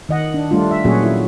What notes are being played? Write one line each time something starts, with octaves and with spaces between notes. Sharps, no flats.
D#3 D#5 F#5
D4
G3 A3 D4 F4
E5
A#2 F#3 A#3 C#4 F#4 G#4
E4